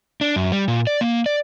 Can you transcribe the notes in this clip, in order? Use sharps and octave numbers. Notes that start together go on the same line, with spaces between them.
D4
F#2
G3
A#2
D5
A#3
D5